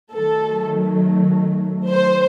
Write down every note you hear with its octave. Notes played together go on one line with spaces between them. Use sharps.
D#3 F#3 A3 A4
C5